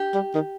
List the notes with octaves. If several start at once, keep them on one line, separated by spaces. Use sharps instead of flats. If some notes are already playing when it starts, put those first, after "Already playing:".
Already playing: G4
G3
D#3